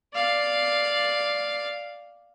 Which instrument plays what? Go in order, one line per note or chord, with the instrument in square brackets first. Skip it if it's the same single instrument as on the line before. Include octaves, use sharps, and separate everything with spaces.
[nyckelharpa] D5 F5